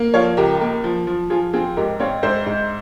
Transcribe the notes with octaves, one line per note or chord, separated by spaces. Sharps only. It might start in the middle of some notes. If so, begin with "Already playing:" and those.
Already playing: A#3
F3 C#5 F5
C#2 G4 A#4
A#3
F3
F3
F3 F4 G#4
C4 F4 G#4
G#2 G4 A#4
C4 C#5 F5
G#2 C5 E5
G#2